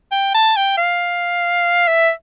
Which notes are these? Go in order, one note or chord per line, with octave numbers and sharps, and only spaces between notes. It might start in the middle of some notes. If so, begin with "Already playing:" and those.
G5
A5
G5
F5
E5